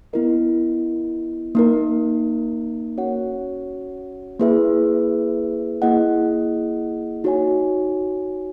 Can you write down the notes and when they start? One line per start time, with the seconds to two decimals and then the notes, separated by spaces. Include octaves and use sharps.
0.13 B3 E4 A#4 D#5
1.55 A#3 D#4 A#4
2.97 C#4 F#4 C#5 F#5
4.40 A#3 E4 G#4 B4 E5
5.82 A#3 E4 G#4 D#5 F#5
7.24 D#4 F#4 C#5 G#5